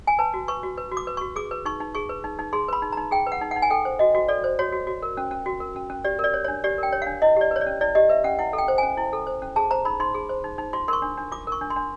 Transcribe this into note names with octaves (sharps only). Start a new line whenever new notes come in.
G#5
B4 A5
F#4
B4 C#6
F#4
B4
F#4
D6
B4
C#6
F#4
G#4 D6
B4
D#4 C#6
D#4
G#4 C#6
B4
D#4
D#4
G#4 C6
B4 B5
D#4
A#5
D#4
G#4 G5
B4
F#5
D#4
F#5
D#4
G#5
A4 G5
C5
F#4 D#5
F#4
A4 D5
C5
F#4 C#5
F#4
F#4
A#4
C#4
C#4
F#4
A#4
C#4
C#4
G4 D5
A#4
D5
C#5
C#5
D4
G4 D5
A#4 G5
C#5
F5
D4
E4 D#5
G4 D5
B4 C#5
D5
C#4
E4 D5
G4 D#5
B4 E5
C#4 F#5
E4 F#5
A4
G5
C5
G#5
C#4
E4
A4
C5
C#4
G#4 A5
C5 A#5
D#4 B5
D#4 C6
G#4
C5
D#4
D#4
F4 C6
A#4 C6 C#6
D4
D4
F4 D6
A#4 C#6
D4
C6
D4